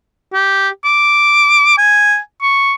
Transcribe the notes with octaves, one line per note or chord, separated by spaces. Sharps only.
G4
D6
G#5
C#6